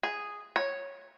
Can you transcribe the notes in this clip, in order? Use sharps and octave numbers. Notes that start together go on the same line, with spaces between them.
G#4
C#5